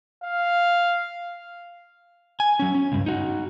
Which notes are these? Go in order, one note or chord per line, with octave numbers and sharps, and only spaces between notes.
F5
G#5
F#3 C#4
C#4
C#2 G2
D#4 F#4